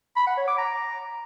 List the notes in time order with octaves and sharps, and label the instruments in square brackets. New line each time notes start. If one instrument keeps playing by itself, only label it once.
[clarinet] B5
F#5
C#5
D6
A#5